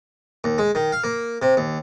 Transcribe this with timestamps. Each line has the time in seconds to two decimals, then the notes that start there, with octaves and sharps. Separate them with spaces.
0.44 D#2
0.58 G#3
0.75 D#3
0.92 F5
1.04 A#3
1.42 C3
1.57 D#2